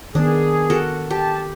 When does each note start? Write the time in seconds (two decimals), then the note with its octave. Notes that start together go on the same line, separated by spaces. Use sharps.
0.15 D#3 B3 D4 G#4
0.70 F#4 A4 A#4
1.10 G4 A5